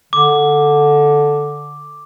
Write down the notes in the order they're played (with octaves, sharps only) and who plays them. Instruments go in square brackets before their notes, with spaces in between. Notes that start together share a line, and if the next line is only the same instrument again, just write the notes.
[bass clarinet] D3 [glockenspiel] D6